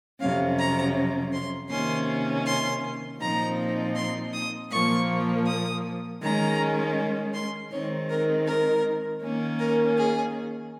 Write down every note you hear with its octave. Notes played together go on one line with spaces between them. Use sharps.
F2 C3 F#3 C#4 F5
A#5
C6
C3 D#3 A#3 C#4 C6
C6
A#2 F3 C4 D#4 A#5
C6
D#6
A#2 F3 A#3 C#6
D#6
D#3 G#3 C#4 A#5
C6
D#3 G#3 C4 D#4 C#5
A#4
A#4
D#3 A#3 C#4
A#4
G#4